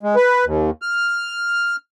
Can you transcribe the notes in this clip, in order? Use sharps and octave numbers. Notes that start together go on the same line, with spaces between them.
G#3
B4
D#2
F6